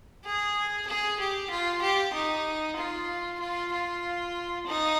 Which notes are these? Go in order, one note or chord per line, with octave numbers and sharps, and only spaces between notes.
G#4
G#4
G4
F4
G4
D#4
F4
F4
F4
D#4